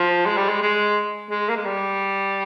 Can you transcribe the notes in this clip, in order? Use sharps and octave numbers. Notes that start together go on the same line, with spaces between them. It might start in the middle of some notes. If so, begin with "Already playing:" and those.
Already playing: F3
G#3
G3
G#3
G#3
G#3
A#3
G#3
G3